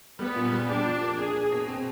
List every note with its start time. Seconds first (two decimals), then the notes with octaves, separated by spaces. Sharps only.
0.19 G3 B3
0.36 A#2
0.52 G3
0.69 D4 G4
0.85 F3
1.02 A#3
1.18 D4 G#4
1.34 A#3
1.52 B2
1.68 C4